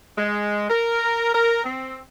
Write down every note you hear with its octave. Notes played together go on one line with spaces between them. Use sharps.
G#3
A#4
A#4
C4